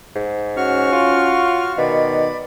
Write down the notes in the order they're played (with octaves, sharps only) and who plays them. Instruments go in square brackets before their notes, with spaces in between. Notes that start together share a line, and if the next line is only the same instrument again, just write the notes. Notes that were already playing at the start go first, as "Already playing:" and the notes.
[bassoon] G#2
[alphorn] C#4 [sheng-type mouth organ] F#4 C#6 F6
[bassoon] F4
[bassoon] B2 [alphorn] D#3 [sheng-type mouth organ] D5 B5